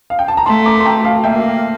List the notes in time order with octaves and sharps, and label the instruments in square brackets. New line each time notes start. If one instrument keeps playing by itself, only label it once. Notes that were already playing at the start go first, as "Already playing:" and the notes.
[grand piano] F5
G5
A5
A#5
[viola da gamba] A3 [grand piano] A5 C6
[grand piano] A#5 D6
C6
G5 A#5
F5 A5
[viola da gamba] A#3 [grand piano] E5 G5